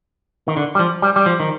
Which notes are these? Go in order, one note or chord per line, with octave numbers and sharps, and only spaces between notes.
D#3
D3
G3
F3
G3
G3
F3
D#3